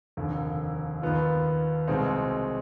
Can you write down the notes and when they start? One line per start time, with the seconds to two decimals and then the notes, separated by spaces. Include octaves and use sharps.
0.17 F1 D#2 D3
1.02 D#2 D#3 B3 F4
1.88 C2 B2 G#3 C4 D#4